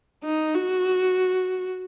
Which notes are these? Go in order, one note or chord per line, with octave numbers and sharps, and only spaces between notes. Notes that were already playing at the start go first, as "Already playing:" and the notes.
D#4
F#4